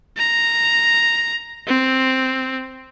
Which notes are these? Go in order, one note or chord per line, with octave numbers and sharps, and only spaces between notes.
A#5
C4